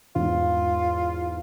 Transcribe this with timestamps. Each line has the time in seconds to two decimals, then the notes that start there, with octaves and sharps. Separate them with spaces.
0.15 E2 G#2 F4